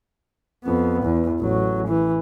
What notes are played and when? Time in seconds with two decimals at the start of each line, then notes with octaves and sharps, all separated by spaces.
0.64 F2 B3
1.03 E2
1.40 A1 F#3
1.87 E3